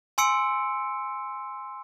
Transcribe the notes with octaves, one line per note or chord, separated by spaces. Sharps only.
G#5 C6 E6 C#7 D7